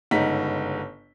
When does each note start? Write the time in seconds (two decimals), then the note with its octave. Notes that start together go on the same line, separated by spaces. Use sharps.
0.11 G1 G#2 C#3 D#4 F#5 B6